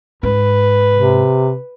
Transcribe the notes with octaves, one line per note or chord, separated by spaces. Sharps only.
G#2 B4
C3